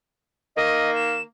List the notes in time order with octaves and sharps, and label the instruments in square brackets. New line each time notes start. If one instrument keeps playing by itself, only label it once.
[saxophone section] D#3 A#3 [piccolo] D#5
[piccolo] E7